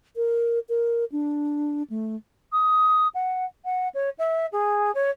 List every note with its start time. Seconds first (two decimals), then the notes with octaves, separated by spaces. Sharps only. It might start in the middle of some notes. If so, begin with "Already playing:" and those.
0.16 A#4
0.69 A#4
1.12 D4
1.90 A3
2.52 D#6
3.14 F#5
3.65 F#5
3.94 C#5
4.19 E5
4.52 G#4
4.95 C#5